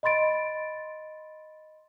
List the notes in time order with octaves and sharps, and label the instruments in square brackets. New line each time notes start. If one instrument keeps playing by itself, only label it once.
[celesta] D#5 B5 C6 A6 D7